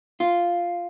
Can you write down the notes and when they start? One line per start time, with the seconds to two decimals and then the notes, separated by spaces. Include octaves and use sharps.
0.20 F4